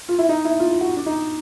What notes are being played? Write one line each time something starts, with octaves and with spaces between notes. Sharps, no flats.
F4
E4
D#4
E4
F4
F4
F#4
D4
D#4